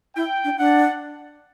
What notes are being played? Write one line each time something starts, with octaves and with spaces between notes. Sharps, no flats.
E4 G5
D4
D4 F#5